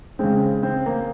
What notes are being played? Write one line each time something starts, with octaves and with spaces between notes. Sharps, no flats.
C#3 G#3 C4
C4
A#3